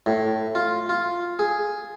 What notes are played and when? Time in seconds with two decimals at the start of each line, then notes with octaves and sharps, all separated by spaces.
0.06 A2
0.55 F4
0.89 F4
1.39 G#4